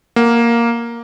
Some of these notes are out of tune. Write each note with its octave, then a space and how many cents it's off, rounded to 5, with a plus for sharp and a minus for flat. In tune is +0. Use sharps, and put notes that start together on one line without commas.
A#3 +0 F#5 +0